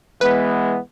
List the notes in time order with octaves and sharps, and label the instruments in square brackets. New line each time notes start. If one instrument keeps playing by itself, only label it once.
[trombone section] E3 G#3 B3 [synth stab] B4